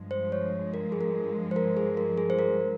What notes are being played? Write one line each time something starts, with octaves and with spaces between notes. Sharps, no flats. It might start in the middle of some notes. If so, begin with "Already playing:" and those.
Already playing: G2 F3 G#3
C5
C#5
A#4
G#4
A#4
C5
A#4
G#4
A#4
G#4
C5
A#4